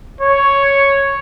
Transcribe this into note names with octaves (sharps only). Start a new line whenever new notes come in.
C#5